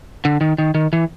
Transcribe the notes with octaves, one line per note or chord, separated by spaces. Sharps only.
D3
D#3
D#3
D#3
E3